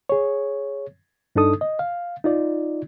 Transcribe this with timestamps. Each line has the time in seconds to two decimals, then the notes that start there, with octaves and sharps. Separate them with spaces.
0.09 G#4 C#5
1.36 G2 D4 D#4 A4 D#6
1.61 D#5
1.79 F5
2.24 D#4 F4 D5